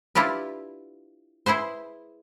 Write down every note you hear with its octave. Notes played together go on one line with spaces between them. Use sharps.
D4 E4 F4 G4 B4
E4 G#4 B4 C5